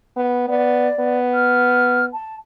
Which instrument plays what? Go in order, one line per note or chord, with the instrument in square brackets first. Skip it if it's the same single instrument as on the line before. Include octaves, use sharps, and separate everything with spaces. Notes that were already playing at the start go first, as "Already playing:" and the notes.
[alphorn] B3
[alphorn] B3 [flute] D5
[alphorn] B3
[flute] F6
A5